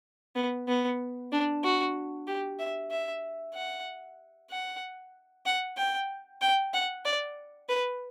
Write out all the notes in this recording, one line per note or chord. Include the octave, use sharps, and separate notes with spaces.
B3
B3
D4
F#4
G4
E5
E5
F#5
F#5
F#5
G5
G5
F#5
D5
B4